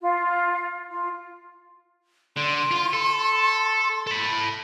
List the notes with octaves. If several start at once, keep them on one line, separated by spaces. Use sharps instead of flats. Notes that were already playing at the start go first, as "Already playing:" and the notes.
F4
F4
D3 C6
F4
A4
A4 B5